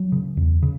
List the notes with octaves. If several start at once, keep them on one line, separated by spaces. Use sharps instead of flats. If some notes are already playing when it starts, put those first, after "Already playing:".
Already playing: F#3
C#3
E2
C#3